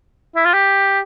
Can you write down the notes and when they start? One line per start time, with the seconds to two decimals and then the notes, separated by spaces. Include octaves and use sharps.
0.36 E4
0.45 F4
0.54 G4